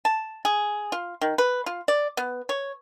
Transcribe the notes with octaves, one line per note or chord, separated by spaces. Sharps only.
A5
G#4
F4
D#3
B4
F4
D5
B3
C#5